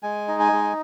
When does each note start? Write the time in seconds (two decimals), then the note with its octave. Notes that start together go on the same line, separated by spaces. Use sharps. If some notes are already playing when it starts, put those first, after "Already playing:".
0.03 G#3 G#5
0.28 D#4
0.40 G#5
0.52 G#3